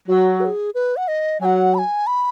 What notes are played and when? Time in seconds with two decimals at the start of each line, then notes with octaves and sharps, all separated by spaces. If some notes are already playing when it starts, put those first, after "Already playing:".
0.08 F#3 F#4
0.40 B4
0.45 G#4
0.74 B4
0.97 F#5
1.08 D#5
1.41 F#3 G#5
1.45 F#5
1.75 B5
1.78 G#5
2.07 B5